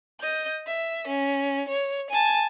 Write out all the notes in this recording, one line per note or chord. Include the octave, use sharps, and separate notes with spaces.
D#5 G6
E5
C#4
C#5
G#5 A5